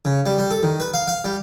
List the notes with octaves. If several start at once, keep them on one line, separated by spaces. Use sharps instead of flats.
C#3
G3
G3
A4
D#3
B4
F5
F5
G3